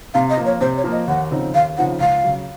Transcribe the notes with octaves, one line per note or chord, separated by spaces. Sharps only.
C3 F5
D#5
F3 A#3 F4
C#5
C3 C5
C#5
F3 A#3 F4
D#5
D#2 F#5
C#3 F3 C4 D#4
D#2 F5
C#3 F3 C4 D#4 F#5
C#2 F5
C#3 F#3